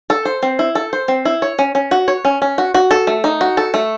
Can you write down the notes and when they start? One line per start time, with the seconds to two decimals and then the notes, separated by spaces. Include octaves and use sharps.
0.10 A4
0.25 C5
0.43 C4
0.59 E4
0.75 A4
0.93 C5
1.08 C4
1.25 E4
1.42 C#5
1.59 C#4
1.75 C#4
1.91 F#4
2.08 C#5
2.25 C#4
2.42 C#4
2.58 F#4
2.74 F#4
2.91 A4
3.07 A3
3.24 D#4
3.41 F#4
3.57 A4
3.74 A3